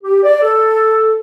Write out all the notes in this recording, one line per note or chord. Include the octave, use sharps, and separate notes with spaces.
G4
D5
A4